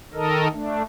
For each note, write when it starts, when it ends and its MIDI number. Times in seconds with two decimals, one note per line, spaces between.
0.14 0.48 51
0.14 0.48 69
0.14 0.48 70
0.14 0.48 75
0.53 0.82 57
0.53 0.82 62